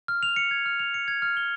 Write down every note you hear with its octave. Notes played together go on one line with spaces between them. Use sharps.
F6
F7
C#7
G#6
F6
F7
C#7
G#6
F6
G7